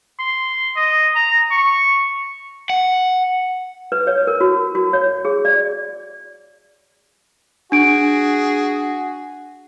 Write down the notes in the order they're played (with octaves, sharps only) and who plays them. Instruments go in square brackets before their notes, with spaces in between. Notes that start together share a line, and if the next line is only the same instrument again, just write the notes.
[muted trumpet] C6
D#5
A#5
C#6
[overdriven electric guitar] F#5
[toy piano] B4
C#5
A#4
F#4
F#4
C#5
G#4
D5
[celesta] D4 D7 [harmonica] F#4 G#4